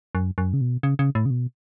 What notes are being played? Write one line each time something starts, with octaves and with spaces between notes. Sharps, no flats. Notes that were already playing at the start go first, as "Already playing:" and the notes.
F#2
F#2
C#3
B2
C#3
C#3
A2
C#3
B2